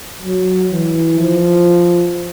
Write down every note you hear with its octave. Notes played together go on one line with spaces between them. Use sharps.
F#3
E3
F3